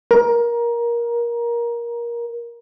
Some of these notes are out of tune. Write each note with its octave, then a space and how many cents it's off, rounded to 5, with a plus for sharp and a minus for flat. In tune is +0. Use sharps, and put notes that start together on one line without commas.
A#4 +20